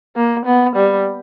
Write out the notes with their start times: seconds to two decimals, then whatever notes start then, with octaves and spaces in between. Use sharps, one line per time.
0.16 A#3
0.46 B3
0.76 G3